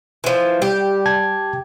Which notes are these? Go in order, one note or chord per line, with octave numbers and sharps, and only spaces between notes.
E3 F3
G3 G4
G5 A5 G#6